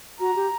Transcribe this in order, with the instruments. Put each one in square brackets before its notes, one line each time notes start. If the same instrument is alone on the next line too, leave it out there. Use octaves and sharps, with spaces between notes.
[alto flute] F#4 [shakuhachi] A#5
[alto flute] G4